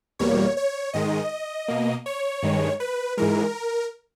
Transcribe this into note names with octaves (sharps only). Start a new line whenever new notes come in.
E2 B2 G3 A#3 C#5
C#5
G#2 D#3 G#3 D#5
B2 A#3
C#5
G2 D#3 G#3
B4
G#2 E3 G#3 A#4